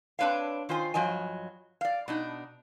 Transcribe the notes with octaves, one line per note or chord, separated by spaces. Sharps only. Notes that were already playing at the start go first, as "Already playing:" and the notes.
C4 D4 B4 C#5 F5
D#3 F4 C5 G#5
G2 F3 F#3 D#5 G#5
D5 F5
B2 D4 D#4